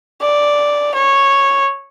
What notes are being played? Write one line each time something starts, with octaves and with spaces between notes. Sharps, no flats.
D5
C#5